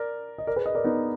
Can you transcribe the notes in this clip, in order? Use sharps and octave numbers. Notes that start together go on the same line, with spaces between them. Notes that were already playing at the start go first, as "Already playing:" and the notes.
Already playing: A#4 D5
D#5
A#4 D5
G#4 B4
D#5
A#4 D5
B3 D#4